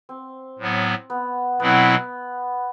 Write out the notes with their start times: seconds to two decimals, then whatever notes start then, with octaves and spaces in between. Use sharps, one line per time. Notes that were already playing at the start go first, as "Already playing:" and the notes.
0.09 C4
0.59 A2 F#3 B3
1.10 B3
1.60 B2 F#3 B3 C4 E4